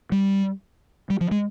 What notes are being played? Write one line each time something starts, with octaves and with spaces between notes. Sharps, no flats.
G3
G3
F3
G#3